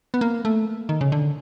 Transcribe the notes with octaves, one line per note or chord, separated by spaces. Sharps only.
B3
A#3
A3
D#3
C#3
D3